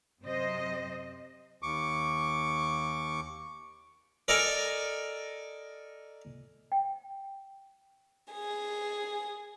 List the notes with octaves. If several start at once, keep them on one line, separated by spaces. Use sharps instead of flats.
F#2 C3 C5 D#5
D#2 C#6 D6
A4 A#4 D5 D#5 G#5 A#5
G5
G#4